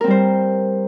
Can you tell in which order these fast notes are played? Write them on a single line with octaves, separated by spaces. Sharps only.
A#4 C4 G3 C5